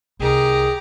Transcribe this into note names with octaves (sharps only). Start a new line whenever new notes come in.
C2 D#3 G4 G#4 A#5